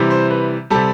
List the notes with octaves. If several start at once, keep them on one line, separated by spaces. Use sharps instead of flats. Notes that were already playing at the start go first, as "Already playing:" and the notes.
Already playing: C3 E3 G3
C5
B4
C3 G3 A4